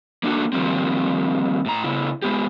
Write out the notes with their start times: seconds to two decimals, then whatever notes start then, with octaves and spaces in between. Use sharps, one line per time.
0.23 A#3 D4 E4 F#4 A4
0.53 D#3 F3 G3 A#3 C4
1.66 A2 A#5
1.84 C#3 B3 E4
2.22 G#3 B3 G4